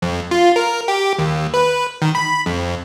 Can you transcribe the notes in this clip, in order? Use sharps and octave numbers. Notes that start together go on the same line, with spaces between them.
F2
F4
A#4
G4
D#2
B4
D#3
B5
F2